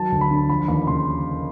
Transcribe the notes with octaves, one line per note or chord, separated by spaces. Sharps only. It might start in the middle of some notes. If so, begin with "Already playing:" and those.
Already playing: D#3 F#3 A5
D2
B5
D3
F3 B5
D#2 B5
C#3 C6